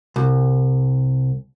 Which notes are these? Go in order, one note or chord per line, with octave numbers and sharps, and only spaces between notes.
C2